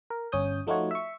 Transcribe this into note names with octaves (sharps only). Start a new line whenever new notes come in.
A#4
G1 C#4 C#5 D#6 G6
F3 A3 D#4 F4 F#4 C#5
E5 C#6